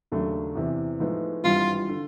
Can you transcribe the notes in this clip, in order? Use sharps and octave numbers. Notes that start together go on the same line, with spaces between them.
D#2 C#3 F#3 A3 D4
E2 C3 E3
A2 F3 G#3 B3 D#4
G#1 G2 E3 G3 F4
D3